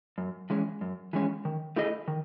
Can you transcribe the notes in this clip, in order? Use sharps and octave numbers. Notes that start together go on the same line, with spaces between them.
F#2
E3 G#3 C#4
F#2
E3 G#3 C#4
D#3
A3 E4 G#4 D#5
D#3